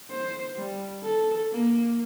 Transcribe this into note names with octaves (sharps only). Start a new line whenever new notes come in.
C5
G3
A4
A#3